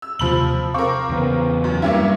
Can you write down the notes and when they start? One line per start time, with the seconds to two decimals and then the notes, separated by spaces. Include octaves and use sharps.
0.02 E6
0.19 D#2 C3 F3 F4 B5 F#7
0.74 C4 A#4 F5 C#6 D6
1.09 E2 C#3 B3
1.64 F#2
1.82 G2 G3 A#3 C#4 E4